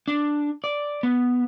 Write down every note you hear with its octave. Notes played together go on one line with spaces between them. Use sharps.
D4
D5
B3